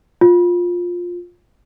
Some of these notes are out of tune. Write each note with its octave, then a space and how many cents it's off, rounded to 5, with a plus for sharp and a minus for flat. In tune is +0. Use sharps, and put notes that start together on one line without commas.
F4 +15